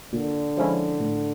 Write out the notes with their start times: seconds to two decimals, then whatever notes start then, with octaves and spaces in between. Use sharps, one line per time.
0.13 A#2 D3
0.57 F3 G#3 C#4 E4
1.00 A2